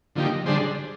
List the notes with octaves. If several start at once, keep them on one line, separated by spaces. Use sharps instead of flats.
D3 F3 A#3 D#4 G4
D3 G3 D4 G#4 C5